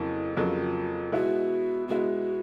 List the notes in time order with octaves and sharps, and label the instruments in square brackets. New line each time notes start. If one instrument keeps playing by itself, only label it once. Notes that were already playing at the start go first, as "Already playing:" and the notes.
Already playing: [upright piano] F2 C#3 F#3 A#3 [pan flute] E4
[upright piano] F2 C#3 F#3 A#3 [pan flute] F4
[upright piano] B2 G#3 B3 E4 [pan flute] F#4
[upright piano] B2 G#3 B3 E4 [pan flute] F#4